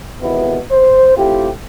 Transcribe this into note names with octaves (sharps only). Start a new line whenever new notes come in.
G#1 D#2 B2 E3 B3 E4
C5
A3 C4 E4 F4 G4